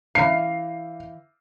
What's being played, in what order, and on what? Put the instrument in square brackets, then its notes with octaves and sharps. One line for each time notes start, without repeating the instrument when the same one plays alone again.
[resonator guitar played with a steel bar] E3 F5 [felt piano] C7